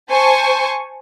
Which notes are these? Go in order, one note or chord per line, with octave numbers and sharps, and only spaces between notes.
C5 G#5 A5 C#6